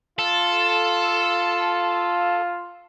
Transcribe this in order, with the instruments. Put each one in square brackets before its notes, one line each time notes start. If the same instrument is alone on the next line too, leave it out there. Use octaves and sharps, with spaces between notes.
[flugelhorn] F4 [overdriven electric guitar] A4